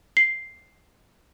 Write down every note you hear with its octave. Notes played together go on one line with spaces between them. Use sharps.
C7